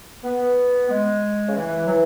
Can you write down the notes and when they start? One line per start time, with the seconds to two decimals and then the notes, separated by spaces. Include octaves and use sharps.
0.24 B3
0.90 G#3
1.47 C#3
1.56 E3
1.86 F#3
1.90 E3